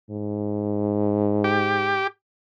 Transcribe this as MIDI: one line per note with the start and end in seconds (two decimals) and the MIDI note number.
0.10 2.04 44
1.44 2.07 67